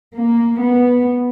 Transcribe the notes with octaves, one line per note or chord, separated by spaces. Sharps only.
A#3
B3